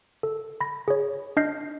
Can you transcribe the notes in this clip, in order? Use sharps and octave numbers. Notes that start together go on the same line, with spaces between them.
A4
B5 A#6
G#4 C#5
D4 D#5 F6 G6 A#6 C7